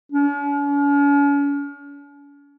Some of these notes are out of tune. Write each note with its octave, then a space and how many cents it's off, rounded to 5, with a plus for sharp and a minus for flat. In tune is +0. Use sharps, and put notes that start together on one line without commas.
C#4 +45